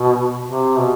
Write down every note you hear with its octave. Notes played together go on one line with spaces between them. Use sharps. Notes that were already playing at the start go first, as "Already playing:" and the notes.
Already playing: B2
C3
B2